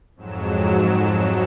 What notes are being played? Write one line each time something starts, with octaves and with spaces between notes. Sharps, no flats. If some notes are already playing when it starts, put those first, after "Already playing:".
F2 G#2 F#3 E7